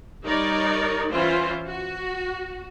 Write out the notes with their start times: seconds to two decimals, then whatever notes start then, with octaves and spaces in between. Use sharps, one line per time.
0.24 G3 D#4 A#4 C#5 D5
1.10 E3 C#4 F4 C5
1.68 F#4